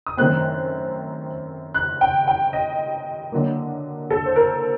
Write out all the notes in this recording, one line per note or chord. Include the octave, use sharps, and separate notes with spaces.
D#6
F#2 D#3 A3 C4 F#6
F#6
G5
G5
D#5
D3 F#3 A#3
A4
C5
A#4